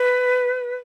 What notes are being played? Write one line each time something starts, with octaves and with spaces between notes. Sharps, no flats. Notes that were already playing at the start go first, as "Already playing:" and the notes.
Already playing: B4